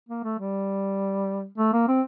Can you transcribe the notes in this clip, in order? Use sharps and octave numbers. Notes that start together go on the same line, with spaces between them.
A#3
A3
G3
A3
A#3
C4